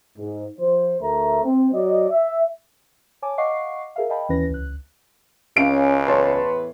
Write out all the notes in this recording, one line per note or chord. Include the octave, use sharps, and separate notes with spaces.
G#2
F3 C5
D2 A3 A#4 E5 A#5
C4
F#3 D5 D#5
E5
C#5 G#5 A5 D6
D#5 F5 F#5 C#6 D6 C7
G#4 A#4 E5 F5
D#5 F5 G5 A5 B5
D#2 E3 C#4 E4 B4 A#6
C#2 F#6
C#2 C#4 F5 D7
E2 A2 B4 C#5 A5 C6